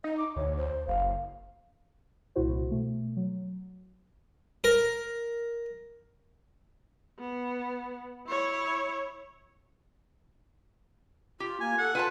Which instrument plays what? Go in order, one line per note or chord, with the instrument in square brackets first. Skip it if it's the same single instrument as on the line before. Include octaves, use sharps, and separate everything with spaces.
[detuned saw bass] D#4 [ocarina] D#5
[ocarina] D6
[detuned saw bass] D2 [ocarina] C#5
[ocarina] C5
[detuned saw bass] F#1 [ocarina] F5
[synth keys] C2 A#2 E4 F#4 C5
B2 A3
F#3
[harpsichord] A#4
[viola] B3
E4 C#5
[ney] F4 [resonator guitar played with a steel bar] G4
[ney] A#3 [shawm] G#5
[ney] A4 [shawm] F#5
[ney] F4 [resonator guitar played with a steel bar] B4 G#5 A5